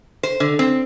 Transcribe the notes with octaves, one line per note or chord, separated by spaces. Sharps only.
C5
D3
C4